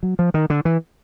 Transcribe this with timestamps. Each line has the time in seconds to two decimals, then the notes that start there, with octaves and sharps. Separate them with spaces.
0.03 F#3
0.19 F3
0.34 D#3
0.50 D3
0.65 E3